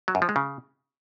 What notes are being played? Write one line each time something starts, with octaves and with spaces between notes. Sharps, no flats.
F#3
F#2
F3
G#3
C#3